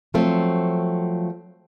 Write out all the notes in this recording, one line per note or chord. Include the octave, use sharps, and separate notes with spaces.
F3 F#3 A3 C4